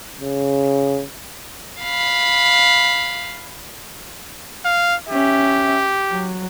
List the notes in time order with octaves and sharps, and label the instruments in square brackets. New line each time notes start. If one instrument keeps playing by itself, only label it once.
[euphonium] C#3
[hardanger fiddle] F5 B5
[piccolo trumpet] F5
[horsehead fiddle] C#4 E5 [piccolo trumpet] G4
[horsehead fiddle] F#3